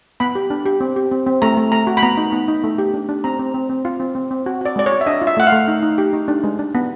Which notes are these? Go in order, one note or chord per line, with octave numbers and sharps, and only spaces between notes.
B3 B5
G4
D4
G4
C4
G4
C4
C4
A3 A#5
A3
A3 A#5
F#4
B5
B3 A#5
D#4
B3
D#4
A3
G4
D4
D4
C4 A#5
C4
C4
C4
F4
C4
C4
C4
F#4
F#4 D5
G#3 D5
C#5
F#4
E5
D4 D#5
F4
E5
A3 F#5
F5
A3
D#4
D#4
G4
D#4
D4
G#3
D4
B3